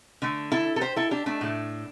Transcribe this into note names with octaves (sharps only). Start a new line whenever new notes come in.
D3 A3
E4 A4
A4
G4 C5
E4 A4
D4 G4
A3 D4
A2 A3